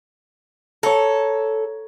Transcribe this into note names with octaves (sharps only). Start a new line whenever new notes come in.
A4 C#5 A#5